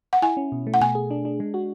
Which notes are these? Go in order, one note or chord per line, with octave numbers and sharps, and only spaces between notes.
F#5
E4 G#5
C#4
B2
A3
F#5
B2 G#5
G#4
D4
D4
G#3
F#4